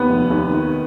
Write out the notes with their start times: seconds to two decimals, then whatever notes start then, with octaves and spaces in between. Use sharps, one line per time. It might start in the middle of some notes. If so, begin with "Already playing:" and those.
Already playing: D#2 B3 B4
0.09 F1
0.31 D#2
0.53 D#3